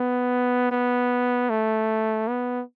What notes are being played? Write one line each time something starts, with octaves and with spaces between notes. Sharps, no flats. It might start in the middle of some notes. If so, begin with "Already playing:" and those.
Already playing: B3
B3
A3
B3